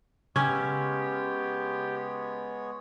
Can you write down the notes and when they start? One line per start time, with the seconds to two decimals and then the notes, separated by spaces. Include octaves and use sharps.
0.36 C#3 G#3 B3 C#4 G4 C#5 E6 F6